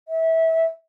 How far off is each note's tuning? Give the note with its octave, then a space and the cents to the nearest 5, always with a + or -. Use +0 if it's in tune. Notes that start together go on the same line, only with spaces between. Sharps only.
E5 -25